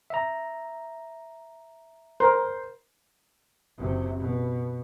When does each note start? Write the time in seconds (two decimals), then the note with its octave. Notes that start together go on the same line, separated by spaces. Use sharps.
0.10 E5 A#5
2.20 A#4 C5
3.78 F#1 C3
4.19 B2